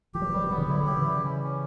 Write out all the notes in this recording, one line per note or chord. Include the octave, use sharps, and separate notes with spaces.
E3 G4
F#3
E3
F#3 G3
E3
F#3 B3
C#3 E3
D3 F#3 E4
F#3 G4
C#3 E3
G3
C#4
C#4